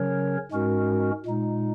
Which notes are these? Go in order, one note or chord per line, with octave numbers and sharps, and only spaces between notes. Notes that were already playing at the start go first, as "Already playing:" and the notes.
Already playing: C#3 F#3 C#4 A#4 C#5
G#2 G#3 C#4 F#4 A#4
A#2 G#3 D#4